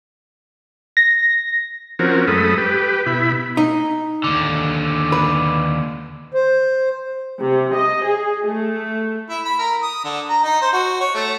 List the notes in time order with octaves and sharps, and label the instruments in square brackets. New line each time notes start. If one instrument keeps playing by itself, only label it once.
[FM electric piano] A#6
[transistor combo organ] F3 C4 C#4 F#4 A#4
F#2 G#3 A3 A4 B5 D#6
G4 B4
B2 E4 B5
[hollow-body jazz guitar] D#4
[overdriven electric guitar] D#2 D3
[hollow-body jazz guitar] B4
[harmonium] C5
[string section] C3
D#5
G#4
A3
[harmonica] E4
B5
A#4
D#6
D3
A#5
D#4
C5
F#4
C#5
A3